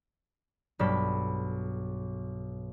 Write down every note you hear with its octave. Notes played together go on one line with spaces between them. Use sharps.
B1 G2 A4 B5